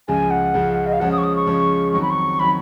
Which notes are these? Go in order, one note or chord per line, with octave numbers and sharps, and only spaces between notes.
C#2 C#3 F3 G#3 G#5
F#5
C#2 C#3 F3 G#3
D#5
F5
C#3 F3 G#3 C#4 F#5
D#6
C#6
D#6
C#6
C#3 F3 G#3 C#4
F2 D#3 F#3 C#6
B5
C#6
D#3 F#3 B5